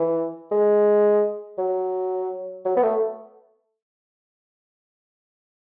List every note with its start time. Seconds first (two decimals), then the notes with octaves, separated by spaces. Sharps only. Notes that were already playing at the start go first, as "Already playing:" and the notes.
Already playing: E3
0.52 G#3
1.58 F#3
2.65 F#3
2.77 B3
2.83 A3